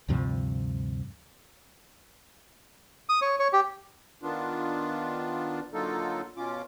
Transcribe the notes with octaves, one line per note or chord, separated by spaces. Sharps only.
D2 G2 C3 F3
D#6
C#5
C#5
G4
D#3 B3 D4 F4
D3 F#3 A#3 D#4 F4 A4
B2 C#4 F4 D6